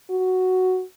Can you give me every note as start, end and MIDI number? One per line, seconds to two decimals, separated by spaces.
0.10 0.83 66